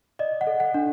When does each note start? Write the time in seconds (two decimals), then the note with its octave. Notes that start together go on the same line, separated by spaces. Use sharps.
0.19 D5 D#5
0.41 F#5
0.47 A4
0.60 F#5
0.74 D4